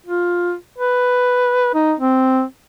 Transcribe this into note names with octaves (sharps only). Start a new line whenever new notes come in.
F4
B4
D#4
C4